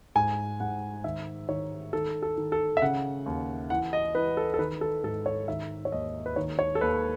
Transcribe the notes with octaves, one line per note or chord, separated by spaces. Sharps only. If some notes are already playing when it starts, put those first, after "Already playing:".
G#2 G#5
G#2 F#5
D#3 E5
D#3 C#5
D#3 A4
A4
D#3
A4
E5
C#3 F#5
D#2
E3 F#5
D#5
E3 B4
A4
A4
D#3 B4
A4
G#2 A4
C#5
D#3 E5
C#5
D#2 D#5
B4
D#3 C#5
C#5
A4
D#2 B4